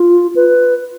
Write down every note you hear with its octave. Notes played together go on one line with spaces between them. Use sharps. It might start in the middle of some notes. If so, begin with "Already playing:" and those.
Already playing: F4
B4